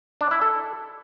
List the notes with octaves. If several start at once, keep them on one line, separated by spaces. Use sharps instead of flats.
D4
E4
A4